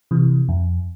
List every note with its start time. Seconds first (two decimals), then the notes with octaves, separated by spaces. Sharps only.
0.11 C3 E3
0.49 F2